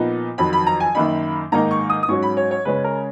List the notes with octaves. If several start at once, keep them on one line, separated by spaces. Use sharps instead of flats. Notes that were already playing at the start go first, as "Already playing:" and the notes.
Already playing: A#2 F3 B3 D#4
F2 D#3 F#3 B5
B5
A#5
G#5
F#2 D#3 A#3 D#4 B5
G#2 D#3 A#3 D#4 A#5
C#6
D#6
D#6
G#2 F#3 C#4 C#6
B5
C#5
C#5
C#3 G#3 C#4 B4
A#4